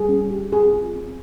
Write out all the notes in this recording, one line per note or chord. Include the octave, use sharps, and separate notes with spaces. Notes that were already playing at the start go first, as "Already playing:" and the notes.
Already playing: G3 G#4
C#4
G4
C4 G#4
F4
C4